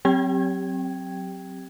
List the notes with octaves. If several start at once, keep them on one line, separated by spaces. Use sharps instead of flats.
F#3 C4 G4 G5 G#6